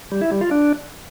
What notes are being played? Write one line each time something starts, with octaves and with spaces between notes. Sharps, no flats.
G3
E4
G3
F4
D4